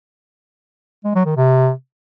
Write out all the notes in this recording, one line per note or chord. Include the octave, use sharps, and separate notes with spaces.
G#3
F#3
D#3
C3